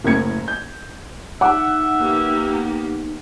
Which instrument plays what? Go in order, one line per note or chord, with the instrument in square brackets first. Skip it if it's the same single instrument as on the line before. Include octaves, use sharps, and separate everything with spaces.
[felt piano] F#1 A2 A#4 G#6 C#7
G6
[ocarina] D#4 [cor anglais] E5 [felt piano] F#5 D6
[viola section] A#3 B3 G4